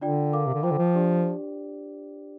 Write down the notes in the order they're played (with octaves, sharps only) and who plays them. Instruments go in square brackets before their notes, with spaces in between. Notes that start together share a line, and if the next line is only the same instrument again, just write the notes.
[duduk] D3 [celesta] D4 F4 D5 G5
[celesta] A#4 F5 D6
[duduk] C3
D3
[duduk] F3 [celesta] F4 C5 G5 D6
[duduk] D3
F3
[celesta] D4 G4 D5